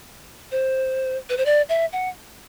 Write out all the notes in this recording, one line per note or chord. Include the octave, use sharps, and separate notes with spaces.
C5
B4
C5
D5
E5
F#5